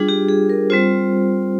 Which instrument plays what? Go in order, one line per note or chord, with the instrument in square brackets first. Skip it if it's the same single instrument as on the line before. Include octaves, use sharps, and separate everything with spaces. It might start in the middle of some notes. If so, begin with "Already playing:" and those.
Already playing: [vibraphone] G3 D4 F4 G#4
G4
G#4
A#4
G3 C4 F4 C5